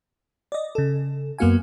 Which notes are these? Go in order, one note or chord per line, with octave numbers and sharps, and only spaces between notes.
D5 D#5
C#3 A4
F#2 A#3 B3 F#4 F5 G#5